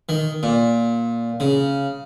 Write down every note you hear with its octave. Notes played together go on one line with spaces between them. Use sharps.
D#3
A#2
C#3